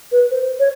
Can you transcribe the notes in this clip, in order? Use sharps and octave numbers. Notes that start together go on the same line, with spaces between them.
B4
C5
C#5